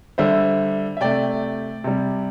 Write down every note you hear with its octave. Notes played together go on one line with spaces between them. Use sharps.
D3 G3 C5 E5
E5
C3 A3 D5 G5
C3 G3